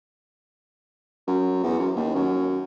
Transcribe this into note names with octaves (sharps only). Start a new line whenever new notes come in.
F#2
E2
F#2
D#2
F#2